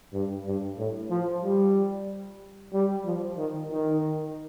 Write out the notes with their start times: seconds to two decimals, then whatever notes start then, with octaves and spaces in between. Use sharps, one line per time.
0.13 G2
0.46 G2
0.77 A2
1.10 F3
1.43 G3
2.73 G3
3.05 F3
3.37 D#3
3.70 D#3